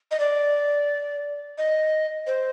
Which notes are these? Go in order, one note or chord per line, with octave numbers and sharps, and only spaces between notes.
D#5
D5
D#5
C5